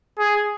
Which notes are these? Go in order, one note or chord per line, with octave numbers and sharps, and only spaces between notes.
G#4